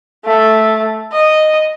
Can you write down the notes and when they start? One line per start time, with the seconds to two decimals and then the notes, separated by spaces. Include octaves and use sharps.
0.25 A3
1.12 D#5